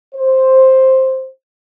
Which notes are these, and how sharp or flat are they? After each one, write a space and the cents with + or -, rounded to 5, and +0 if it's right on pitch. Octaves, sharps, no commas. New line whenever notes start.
C5 +5